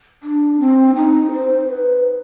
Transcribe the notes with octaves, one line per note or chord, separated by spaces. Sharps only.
D4
C4
D#4
C5
B4